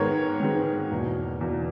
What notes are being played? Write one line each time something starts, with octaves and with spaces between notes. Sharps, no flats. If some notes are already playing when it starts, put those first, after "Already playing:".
Already playing: G#2 D#3 G#3 B3 A#4 C#5
G#2 D#3 G#3 B3
E2 B2 A#3
E2 B2 A#3